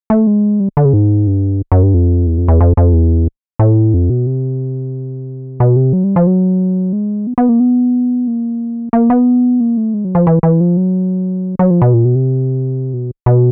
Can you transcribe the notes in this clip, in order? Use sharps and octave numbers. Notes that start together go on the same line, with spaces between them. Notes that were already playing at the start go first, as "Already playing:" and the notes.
A3
G#3
G3
D3
C#3
G#2
G2
F#2
G2
F2
E2
F2
E2
F2
F2
E2
A2
F2
B2
C3
B2
C3
F#3
G3
F3
F#3
G#3
B3
B3
A#3
B3
A#3
A#3
B3
A#3
A3
G#3
F#3
F3
E3
E3
F3
F#3
F#3
F3
B2
A#2
B2
C3
B2
B2